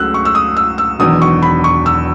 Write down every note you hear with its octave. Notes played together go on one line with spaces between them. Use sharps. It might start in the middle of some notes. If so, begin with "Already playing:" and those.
Already playing: C#2 C#3 F#3 A3 E6 F#6
C#6
E6
D#6
E6
E6
E1 E2 D#3 F#3 D#6
C#6
B5
C#6
E6